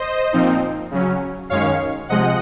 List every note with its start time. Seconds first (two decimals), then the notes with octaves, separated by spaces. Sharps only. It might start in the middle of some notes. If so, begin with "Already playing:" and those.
Already playing: C5 D#5
0.33 A#2 F3 C4 D#4
0.91 C#3 F#3 C#4
1.50 F#2 D#3 G#3 C#4 C#5 F5
2.09 C3 F3 G#3 D#5 F#5